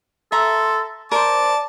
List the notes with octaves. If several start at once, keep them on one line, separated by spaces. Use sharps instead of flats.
A4 E5 A#5 C6
A#4 C5 D5 A5 D6